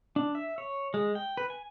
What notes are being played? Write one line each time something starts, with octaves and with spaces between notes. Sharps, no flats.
D4
E5
C#5
G#3
G5
B4
G#5